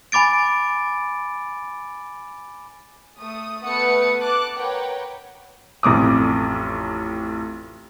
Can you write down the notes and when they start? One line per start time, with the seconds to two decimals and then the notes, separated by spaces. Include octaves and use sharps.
0.12 G#5 B5 D6 A6 D7
3.19 A3 D#6
3.63 A3 B3 B4 F#5 D#6 C#7
4.21 A5 D6 F#6
4.56 A#4 B4 C#5 F#5 G5
5.83 A1 F2 D6 D#6